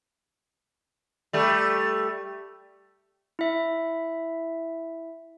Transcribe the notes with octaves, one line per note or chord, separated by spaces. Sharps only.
G3 A3
E4 E5